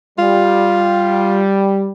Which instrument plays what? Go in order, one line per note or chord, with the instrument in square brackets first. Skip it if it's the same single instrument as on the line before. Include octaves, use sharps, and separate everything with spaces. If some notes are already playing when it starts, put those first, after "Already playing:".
[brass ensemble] G3 [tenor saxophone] F4